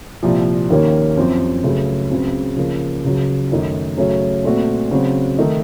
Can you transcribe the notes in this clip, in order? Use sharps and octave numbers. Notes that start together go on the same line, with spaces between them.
C2 A#2 F3
D#2 D#3 A#3 C#4
F#2 F3 C4
C#2 C#3 F#3 A3 C#4
C#2 C#3 F#3 C4
C#3 F3 A#3
C#2 C#3 F#3
F#2 D#3 A3 D#4
C#3 F#3 A3 C#4
A#2 A3 C4 F#4
C#3 F#3 C4 F#4
D#3 A3 D#4